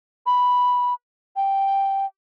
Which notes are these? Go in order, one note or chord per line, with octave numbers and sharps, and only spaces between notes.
B5
G5